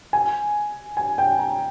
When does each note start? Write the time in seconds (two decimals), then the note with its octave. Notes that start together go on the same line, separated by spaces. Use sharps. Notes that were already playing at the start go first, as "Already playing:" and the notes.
0.13 G#5
0.97 G#5
1.18 G5
1.39 A#5